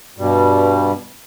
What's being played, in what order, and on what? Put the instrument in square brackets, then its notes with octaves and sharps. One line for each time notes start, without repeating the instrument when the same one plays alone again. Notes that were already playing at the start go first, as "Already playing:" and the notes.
[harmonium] G2 B2 G3